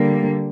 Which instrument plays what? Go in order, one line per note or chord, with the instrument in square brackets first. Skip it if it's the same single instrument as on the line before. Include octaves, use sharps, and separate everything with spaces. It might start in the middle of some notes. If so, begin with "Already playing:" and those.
Already playing: [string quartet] D3 G3 A#3